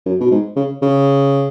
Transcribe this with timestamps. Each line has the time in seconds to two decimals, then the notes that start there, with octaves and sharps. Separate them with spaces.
0.06 F#2
0.21 B2
0.32 G#2
0.56 C#3
0.82 C#3